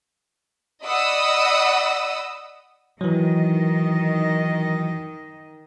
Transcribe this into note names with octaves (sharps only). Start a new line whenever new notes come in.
D5 D#5 F#5 B5 D#6 E6
D#3 E3 F#3 D#5